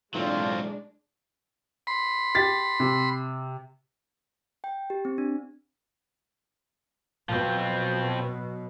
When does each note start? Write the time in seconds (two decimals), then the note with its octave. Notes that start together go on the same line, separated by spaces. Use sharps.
0.14 B2 E3 F#3 G#3 A3 C4 D4 F4
1.87 B5 C6
2.35 G4 A6 B6
2.80 C3
4.64 G5
4.90 G4
5.05 C4
5.18 D4
7.29 B2 F3 F#3 C4